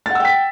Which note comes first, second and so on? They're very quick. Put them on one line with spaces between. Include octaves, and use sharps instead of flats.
A6 F#5 E6 G5 B6